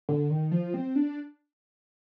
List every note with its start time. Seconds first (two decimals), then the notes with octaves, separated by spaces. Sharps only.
0.09 D3
0.30 D#3
0.51 F3
0.74 C4
0.96 D4